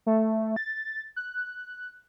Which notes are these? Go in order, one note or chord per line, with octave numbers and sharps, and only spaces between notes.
A3
A6
F#6